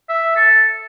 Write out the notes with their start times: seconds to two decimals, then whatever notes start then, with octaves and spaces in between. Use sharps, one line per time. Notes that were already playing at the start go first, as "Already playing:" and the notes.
0.09 E5
0.36 A4